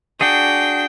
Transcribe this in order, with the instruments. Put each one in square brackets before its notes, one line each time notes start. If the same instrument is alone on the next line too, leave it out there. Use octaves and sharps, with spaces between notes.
[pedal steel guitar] D4 F#4 G#4 [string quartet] G5